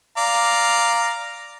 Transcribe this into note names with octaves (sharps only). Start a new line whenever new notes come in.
D5 F5 A#5